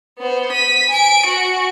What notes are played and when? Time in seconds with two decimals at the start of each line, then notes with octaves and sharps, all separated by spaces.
0.19 B3 C5
0.52 B6 D#7
0.90 G#5 D7
1.26 F#4 F#5